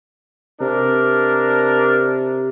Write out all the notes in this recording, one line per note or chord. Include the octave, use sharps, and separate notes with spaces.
C3 D4 A#4